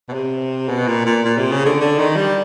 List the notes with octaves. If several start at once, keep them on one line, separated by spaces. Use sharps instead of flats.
B2
C3
B2
A#2
A#2
A#2
C3
C#3
D3
D3
D#3
G3